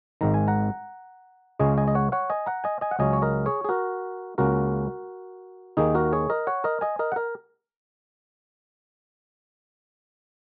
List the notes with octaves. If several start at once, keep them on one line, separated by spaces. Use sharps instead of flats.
G#1 G#2 D#3 A#5
G#5
F#5 A#5
C#2 C#3 G#3 C#4 D#5 G#5
D#5 G#5
D#5
C#5 F#5
C#5 F#5
D#5 G#5
F#5 A#5
D#5 G#5
D#5 G#5
F#5
C#2 C#3 F#3 C#4 D#5 G#5
C#5
A#4 D#5
G#4 C#5
G#4
F#4 A#4
C#2 C#3 A#3 C#4 F#4 A#4
D#2 D#3 A#3 D#4 G#4
F#4 A#4
G#4 C#5
A#4 D#5
C#5 F#5
A#4 D#5
D#5 G#5
A#4 D#5
F#5
A#4